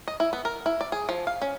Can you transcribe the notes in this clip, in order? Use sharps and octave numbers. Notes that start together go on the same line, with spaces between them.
D#5
E4
B3
A#4
E4
D5
G#4
F3
F5
C#4